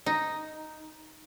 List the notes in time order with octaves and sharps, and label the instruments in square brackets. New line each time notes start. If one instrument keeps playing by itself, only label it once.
[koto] D#4